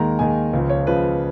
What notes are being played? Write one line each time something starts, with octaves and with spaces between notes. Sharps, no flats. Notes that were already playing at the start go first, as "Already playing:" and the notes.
Already playing: D#2 D#3 G#3 A#5
D#2 D#3 G#3 G#5
C#2 C#3 F3
C#5
C#2 C#3 F3 B4